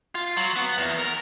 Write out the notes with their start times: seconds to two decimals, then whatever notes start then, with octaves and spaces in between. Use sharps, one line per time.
0.15 F4
0.37 F#3
0.56 B3
0.78 E2
0.98 A#4